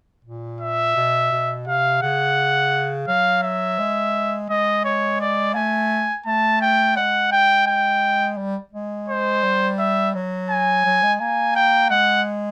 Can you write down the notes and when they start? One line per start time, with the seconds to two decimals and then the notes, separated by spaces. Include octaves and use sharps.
0.25 A#2
0.61 E5
0.96 B2
1.32 B2
1.67 C3 F5
2.02 C#3 F#5
3.07 F#3 F5
3.43 E5
3.79 G#3
4.49 G#3 D#5
4.85 C#5
5.21 D5
5.55 A3 G#5
6.26 A3 A5
6.61 G5
6.97 G#3 F#5
7.32 G5
7.67 G5
8.37 G3
8.73 G#3
9.09 C5
9.44 G3
9.79 E5
10.14 F#3
10.50 G#5
10.85 F#3
11.03 G#3
11.20 A#3 G#5
11.56 G5
11.90 G#3 F#5